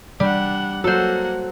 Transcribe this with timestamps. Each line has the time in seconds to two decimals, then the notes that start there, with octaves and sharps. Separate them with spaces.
0.20 G3 D4 F#5
0.84 F#3 A#3 A4 C5 F#5